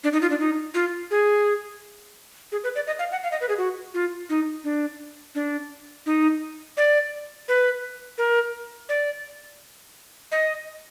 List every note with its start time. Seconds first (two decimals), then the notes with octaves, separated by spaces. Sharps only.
0.04 D4
0.13 D#4
0.22 F4
0.30 D4
0.39 D#4
0.74 F4
1.11 G#4
2.52 G#4
2.64 B4
2.75 D5
2.87 D#5
2.99 F5
3.12 F#5
3.23 F5
3.32 D#5
3.41 B4
3.49 G#4
3.58 F#4
3.94 F4
4.30 D#4
4.64 D4
5.35 D4
6.06 D#4
6.77 D5
7.48 B4
8.18 A#4
8.89 D5
10.32 D#5